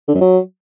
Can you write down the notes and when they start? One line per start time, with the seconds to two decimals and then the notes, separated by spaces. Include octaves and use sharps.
0.08 D3
0.14 F#2
0.21 F#3